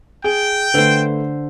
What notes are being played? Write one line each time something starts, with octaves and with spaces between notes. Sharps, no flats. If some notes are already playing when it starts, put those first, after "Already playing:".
G#4 G5
D3 A3 B4 C5